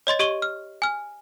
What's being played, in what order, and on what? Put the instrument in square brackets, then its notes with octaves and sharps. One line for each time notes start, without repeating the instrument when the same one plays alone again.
[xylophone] C#5 D#5 C6 A6
G4 D#5 C#6 D#7 G7
F6
G#5 F6